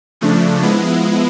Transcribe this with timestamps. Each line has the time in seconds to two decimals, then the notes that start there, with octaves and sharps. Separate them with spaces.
0.21 C#3 F3 A3 D4
0.61 F3 G#3 B3 E4